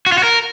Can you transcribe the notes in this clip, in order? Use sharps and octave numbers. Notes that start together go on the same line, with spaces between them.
F#4
F4
F#4
A#4